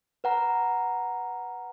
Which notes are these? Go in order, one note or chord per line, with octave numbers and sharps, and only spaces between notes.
B4 F#5 A#5